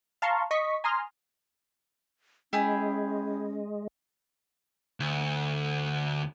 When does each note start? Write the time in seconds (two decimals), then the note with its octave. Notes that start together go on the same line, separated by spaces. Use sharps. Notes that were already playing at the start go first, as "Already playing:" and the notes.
0.22 F5 A5 A#5 C6 C#6
0.51 D#5 C#6 B6
0.84 G#5 A#5 C6 D#6 F6
2.53 G#3 C#4 E4 G4 G#4
5.00 D2